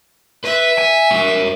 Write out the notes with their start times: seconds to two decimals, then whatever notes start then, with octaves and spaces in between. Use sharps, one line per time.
0.44 B4 E5
0.78 G#5
1.11 A#4 C#5